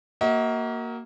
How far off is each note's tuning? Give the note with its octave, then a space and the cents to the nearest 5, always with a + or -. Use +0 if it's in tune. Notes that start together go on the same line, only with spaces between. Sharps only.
A#3 +0 F#4 +15 D#5 +45